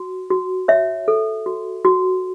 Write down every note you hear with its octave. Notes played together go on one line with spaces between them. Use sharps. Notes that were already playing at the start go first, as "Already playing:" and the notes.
Already playing: F#4
F#4
C#5 E5
A4
F#4
F#4